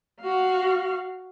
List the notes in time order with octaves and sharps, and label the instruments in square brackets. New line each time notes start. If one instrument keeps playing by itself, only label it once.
[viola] F#4 F5